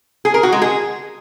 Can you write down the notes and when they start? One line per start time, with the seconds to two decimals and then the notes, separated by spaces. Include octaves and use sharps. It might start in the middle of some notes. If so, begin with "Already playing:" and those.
0.25 G#4
0.34 A#4
0.43 F#4
0.52 G#3
0.62 G#4